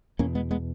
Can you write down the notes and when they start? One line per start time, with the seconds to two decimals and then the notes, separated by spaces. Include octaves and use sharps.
0.19 E2 B2 A#3 C#4
0.35 G#3 B3
0.51 G#3 B3